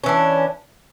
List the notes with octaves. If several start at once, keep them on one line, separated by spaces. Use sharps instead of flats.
E3 C#4 D4